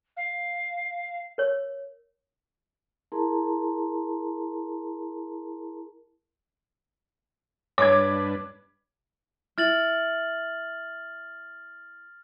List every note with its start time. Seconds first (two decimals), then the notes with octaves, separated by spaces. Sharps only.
0.16 F5
1.38 A#4 C#5
3.12 E4 G#4 A#4 A5 A#5 C6
7.78 G2 D4 B4 C#5 D6 G#6
9.58 E4 F6 A6 F#7